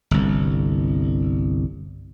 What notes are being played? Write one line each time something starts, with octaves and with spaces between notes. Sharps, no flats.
G1 C2